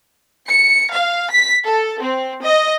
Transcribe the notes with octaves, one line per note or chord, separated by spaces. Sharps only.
C#7
F5
B6
A4
C4
D#5